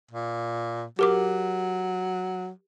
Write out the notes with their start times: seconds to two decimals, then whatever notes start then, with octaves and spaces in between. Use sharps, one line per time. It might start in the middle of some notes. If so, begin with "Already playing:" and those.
0.11 A#2
0.99 F#3 G4 A#4 D6